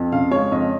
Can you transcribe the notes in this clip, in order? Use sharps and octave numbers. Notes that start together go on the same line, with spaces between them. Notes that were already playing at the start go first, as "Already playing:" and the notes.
Already playing: F2
C#3 F5
G#3 C#5
F2 D#5